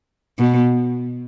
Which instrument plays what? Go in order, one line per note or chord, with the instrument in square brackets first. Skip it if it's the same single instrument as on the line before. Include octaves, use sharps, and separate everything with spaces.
[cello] B2